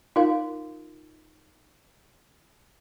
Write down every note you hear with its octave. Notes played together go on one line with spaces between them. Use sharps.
D#4 F4 A#4 F5